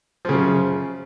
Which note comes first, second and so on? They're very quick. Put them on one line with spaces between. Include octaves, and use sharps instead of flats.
F3 C#3 F#2